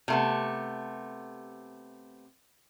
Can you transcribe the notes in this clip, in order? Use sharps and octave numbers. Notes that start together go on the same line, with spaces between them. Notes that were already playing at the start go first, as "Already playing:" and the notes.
C3 A3 B3